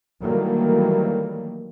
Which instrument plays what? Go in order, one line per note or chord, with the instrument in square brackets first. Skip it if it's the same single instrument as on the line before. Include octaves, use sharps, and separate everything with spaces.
[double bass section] D#3 E3 F#3 G3 A3 A#3